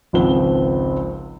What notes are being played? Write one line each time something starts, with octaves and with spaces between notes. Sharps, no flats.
G#1 C#2 F3 C4 F#5 G7